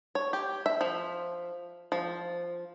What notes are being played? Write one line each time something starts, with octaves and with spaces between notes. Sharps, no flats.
C#5
G4
E5
F3
F3